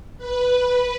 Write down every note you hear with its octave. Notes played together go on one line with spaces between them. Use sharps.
B4